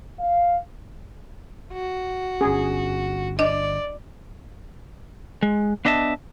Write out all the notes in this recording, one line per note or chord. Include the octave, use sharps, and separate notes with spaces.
F5
F#4
G1 C#4 G#4
D4 D5 D#5
G#3
B3 D4 D#5 E5 A5